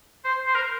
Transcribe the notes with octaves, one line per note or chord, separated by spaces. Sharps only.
C5
C5
A#4